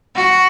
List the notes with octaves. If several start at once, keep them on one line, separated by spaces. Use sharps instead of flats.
F#4